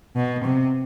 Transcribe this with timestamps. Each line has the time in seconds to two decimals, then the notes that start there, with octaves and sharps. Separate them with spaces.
0.16 B2
0.45 C3